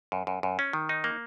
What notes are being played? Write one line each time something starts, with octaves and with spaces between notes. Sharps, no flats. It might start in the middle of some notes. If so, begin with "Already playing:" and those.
F#2
F#2
F#2
C#4
D#3
D#4
A#3